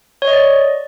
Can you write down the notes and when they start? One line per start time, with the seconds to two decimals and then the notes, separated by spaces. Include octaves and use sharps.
0.22 C#5
0.28 D#5
0.33 D5